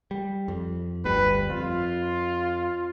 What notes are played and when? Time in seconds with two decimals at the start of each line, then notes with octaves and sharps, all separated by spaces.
0.11 G3
0.48 F2
1.05 G1 D2 G3 B4
1.50 F2 F4